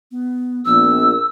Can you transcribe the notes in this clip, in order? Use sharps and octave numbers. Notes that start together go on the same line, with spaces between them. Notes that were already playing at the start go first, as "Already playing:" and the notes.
B3
A#1 B3 E6